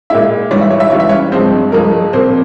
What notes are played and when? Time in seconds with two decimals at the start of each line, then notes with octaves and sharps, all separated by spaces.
0.10 A#2 G#3 E4 E5
0.51 G#2 E3 G3 C#5
0.61 E5
0.71 C#5
0.80 E5
0.90 G#2 E3 G3 C#5
1.00 E5
1.09 C#4 C#5
1.32 G2 F3 G#3 C4 C5
1.72 G2 F3 G#3 A#3 A#4
2.13 A#2 F3 A#3 C4 C5